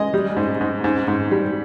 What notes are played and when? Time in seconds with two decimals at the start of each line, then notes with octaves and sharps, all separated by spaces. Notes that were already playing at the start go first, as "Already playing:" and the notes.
Already playing: G#3 D#5
0.14 G3
0.37 G#2
0.61 G#2
0.84 G#2
1.08 G#2
1.31 G3